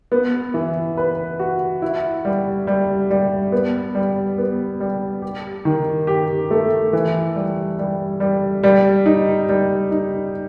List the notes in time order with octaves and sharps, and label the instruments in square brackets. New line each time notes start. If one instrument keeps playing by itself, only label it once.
[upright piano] B3
E3
B4
F#4
E4
G3
G3
G3
B3
G3
B3
G3
G4
D#3
G4
A3
E3
G3
G3
G3
G3
D#4
G3
D#4